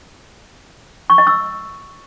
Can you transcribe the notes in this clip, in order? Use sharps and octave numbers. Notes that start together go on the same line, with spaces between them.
C#6
D#5
E6